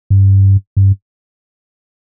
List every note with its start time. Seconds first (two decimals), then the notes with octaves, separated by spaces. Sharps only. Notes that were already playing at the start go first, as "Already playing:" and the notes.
0.10 G2
0.77 G2